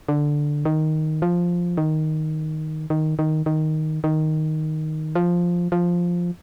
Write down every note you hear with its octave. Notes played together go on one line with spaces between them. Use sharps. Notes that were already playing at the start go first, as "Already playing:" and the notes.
D3
D#3
F3
D#3
D#3
D#3
D#3
D#3
F3
F3